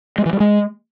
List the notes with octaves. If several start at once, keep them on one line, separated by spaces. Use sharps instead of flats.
G#3
E3
G3
G#3